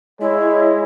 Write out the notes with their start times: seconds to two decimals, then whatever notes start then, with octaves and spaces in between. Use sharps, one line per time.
0.21 G#3 E4 C#5